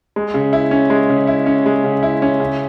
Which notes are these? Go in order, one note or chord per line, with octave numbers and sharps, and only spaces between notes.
G#3
C#3
E4
C#4
G#3
C#3
E4
C#4
G#3
C#3
E4
C#4
C#3